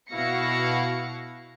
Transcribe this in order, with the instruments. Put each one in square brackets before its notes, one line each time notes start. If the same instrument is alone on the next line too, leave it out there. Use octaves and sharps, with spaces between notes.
[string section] B2 E4 F#4 F5 A#6 C#7